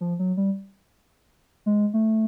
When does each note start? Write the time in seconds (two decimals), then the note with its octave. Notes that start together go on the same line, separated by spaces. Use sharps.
0.01 F3
0.19 F#3
0.37 G3
1.66 G#3
1.94 A3